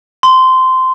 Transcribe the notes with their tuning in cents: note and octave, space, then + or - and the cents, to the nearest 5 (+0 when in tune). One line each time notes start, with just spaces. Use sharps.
C6 -15